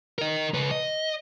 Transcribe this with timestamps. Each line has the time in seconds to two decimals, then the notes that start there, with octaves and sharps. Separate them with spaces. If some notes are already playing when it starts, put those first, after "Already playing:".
0.18 A#4 D#5
0.54 C#3 B4
0.71 D#5